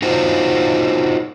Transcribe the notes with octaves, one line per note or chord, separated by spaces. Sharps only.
D#4 F4 F#4 C5